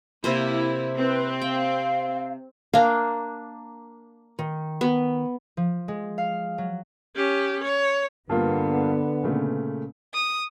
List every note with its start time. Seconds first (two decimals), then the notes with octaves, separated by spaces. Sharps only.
0.24 C3 A#3 E4 C5
0.97 C4 B4
1.42 F5 G5
2.74 A#3 D4 F5
4.39 D#3
4.81 B3
5.57 F3
5.88 G#3
6.18 F5
6.58 F#3
7.16 C#4 G4
7.64 C#5
8.29 G2 D3 A#3 B3 F4
9.24 A#2 C#3 A3
10.14 D#6